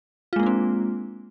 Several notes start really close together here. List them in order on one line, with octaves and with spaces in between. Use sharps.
F4 G#3 A#3 D4 C4